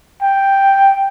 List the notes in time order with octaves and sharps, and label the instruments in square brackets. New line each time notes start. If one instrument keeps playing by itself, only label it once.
[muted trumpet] G5